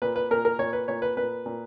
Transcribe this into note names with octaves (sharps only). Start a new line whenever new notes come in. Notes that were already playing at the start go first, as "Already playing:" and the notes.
A#2 B4
B4
A#2 A#4
A#4
A#2 C#5
B4
A#2 C#5
B4
A#2 B4
A#2